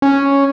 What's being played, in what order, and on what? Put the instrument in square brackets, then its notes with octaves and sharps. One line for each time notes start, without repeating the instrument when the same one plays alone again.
[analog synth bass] C#4